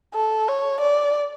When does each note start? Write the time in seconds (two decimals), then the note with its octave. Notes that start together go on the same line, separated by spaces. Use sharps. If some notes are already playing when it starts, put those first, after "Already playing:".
0.14 A4
0.48 C#5
0.81 D5